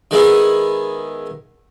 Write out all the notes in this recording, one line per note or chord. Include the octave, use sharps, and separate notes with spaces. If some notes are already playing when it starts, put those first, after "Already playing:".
D#3 G#3 B3 E4 G#4